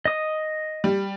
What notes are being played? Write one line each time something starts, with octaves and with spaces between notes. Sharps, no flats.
D#5 D#6
G3